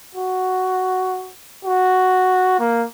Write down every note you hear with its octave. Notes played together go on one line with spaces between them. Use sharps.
F#4
F#4
A#3